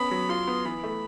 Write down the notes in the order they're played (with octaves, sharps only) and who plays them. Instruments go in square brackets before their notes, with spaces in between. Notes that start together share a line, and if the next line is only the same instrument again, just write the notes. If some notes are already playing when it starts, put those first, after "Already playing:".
Already playing: [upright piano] B3 C#4 [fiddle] B5
[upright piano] F#3
[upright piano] F4 [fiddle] C6
[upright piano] B3
[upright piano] E3 [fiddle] B5
[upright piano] A3